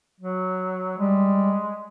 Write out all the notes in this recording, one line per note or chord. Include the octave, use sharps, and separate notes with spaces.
F#3
G3 G#3